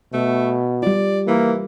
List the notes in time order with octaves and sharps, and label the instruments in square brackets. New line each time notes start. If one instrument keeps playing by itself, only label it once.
[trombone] B2 [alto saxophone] A3
[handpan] G3 F4 [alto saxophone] D5
[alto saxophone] E3 [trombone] A#3